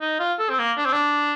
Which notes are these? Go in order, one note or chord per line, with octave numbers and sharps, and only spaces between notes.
D#4
F4
A4
C4
A#3
D4
C4
D4